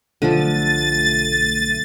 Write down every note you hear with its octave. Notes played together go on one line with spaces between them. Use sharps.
B1 D3 F3 A3 A4 A6 D#7